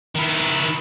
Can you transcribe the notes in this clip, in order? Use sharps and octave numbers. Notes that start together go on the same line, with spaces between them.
D#3 E4